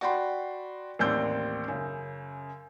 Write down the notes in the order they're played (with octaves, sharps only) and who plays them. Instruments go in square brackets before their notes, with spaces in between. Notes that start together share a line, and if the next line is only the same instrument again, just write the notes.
[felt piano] F#4 D5 G5 B5 C6
A1 D#2 C4 D5 E6 G6
F#2 C#3